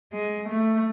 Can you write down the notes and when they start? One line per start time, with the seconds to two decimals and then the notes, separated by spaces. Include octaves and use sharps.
0.13 G#3
0.48 A3